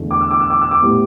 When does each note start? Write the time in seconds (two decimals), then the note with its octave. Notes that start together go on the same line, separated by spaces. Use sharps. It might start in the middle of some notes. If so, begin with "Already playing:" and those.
Already playing: E2 D3 A3
0.11 D6
0.21 E6
0.31 D6
0.40 E6
0.50 D6
0.61 E6
0.71 D6
0.81 A2 G3 B3